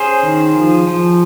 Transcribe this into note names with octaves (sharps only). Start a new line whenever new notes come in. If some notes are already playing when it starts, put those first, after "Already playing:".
Already playing: C#4 G#4 C5
D#3
F3
F3